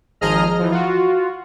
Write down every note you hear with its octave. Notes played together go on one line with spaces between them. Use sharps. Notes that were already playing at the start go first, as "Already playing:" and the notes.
G#1 F3 G#4 D#5 A#5 F6
E3 F3
F4 F#4